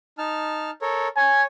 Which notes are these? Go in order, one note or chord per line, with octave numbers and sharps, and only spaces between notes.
D#4 A5 F6
A4 A#4 C#5
C#5 G#5